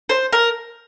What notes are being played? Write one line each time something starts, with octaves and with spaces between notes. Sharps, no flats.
C5
A#4